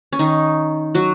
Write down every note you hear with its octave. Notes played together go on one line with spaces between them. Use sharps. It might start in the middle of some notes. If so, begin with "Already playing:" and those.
C#4
D#3 D#4
F#3 F#4